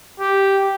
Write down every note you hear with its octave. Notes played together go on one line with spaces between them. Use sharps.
G4